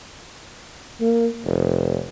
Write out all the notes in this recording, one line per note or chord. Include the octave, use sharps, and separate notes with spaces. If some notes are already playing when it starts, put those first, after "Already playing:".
A#3
F1